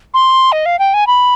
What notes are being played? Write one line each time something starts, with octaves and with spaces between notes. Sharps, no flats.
C6
D#5
F5
G5
G#5
B5